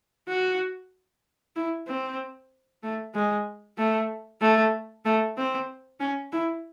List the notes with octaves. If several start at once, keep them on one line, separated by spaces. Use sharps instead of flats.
F#4
E4
C4
A3
G#3
A3
A3
A3
C4
C#4
E4